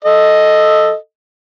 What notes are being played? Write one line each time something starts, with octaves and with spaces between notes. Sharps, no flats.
A4 D#5